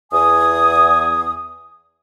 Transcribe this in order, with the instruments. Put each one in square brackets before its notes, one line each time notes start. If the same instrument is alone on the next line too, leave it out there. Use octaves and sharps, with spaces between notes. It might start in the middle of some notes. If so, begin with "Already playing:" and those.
[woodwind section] E2 G#5 D#6